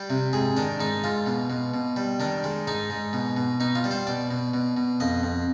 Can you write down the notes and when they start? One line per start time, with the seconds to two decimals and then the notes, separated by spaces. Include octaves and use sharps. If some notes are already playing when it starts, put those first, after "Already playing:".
Already playing: G3 G4
0.10 C3
0.33 G#2 G#4
0.57 D#3 D4
0.80 G#2 D#4
1.04 G#2 F4
1.26 B2
1.50 B2
1.74 B2
1.96 G3
2.20 D#3 D4
2.44 G#3
2.67 G#2 D#4
2.90 G#2
3.13 B2
3.37 B2
3.60 B2 D#4
3.75 F4
3.84 G3
3.91 C5
4.07 B2 D5
4.31 B2
4.54 B2
4.77 B2
5.00 F2 D#5
5.23 F2